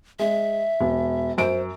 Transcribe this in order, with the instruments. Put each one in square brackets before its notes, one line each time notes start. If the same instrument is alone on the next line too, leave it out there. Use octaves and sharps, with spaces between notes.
[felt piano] G#3 [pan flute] E5
[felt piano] E1
[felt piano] F#2 D7 [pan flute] C5